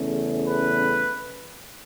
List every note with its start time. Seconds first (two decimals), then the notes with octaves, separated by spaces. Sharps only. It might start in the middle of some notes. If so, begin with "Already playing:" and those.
Already playing: E2 C#3 A3 C#4
0.48 B4